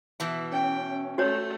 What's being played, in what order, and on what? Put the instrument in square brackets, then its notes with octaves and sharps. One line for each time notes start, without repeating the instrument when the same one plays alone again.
[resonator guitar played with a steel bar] B2 E3 E4
[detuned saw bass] C#4 [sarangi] G5
[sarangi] A3 [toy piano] F#4 C#5